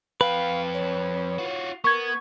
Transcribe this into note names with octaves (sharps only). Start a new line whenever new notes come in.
F2 B4 F5 G5
C#5
F4 F#4
B3 A#4 C#6 G#6